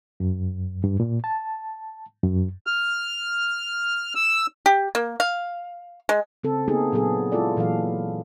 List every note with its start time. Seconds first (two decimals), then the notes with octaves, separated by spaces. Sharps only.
0.20 F#2
0.84 G2
1.00 A#2
1.24 A5
2.23 F#2
2.67 F6
4.15 E6
4.66 G4
4.95 A#3
5.20 F5
6.09 G#3
6.44 C#3 C4 A4
6.68 A#3 B3 D#4 G4 G#4
6.92 A#2 F#3 B3 G#4 A4
7.32 G#3 E4 F4 A4 D5
7.57 A#2 E3 F#3 A4 F5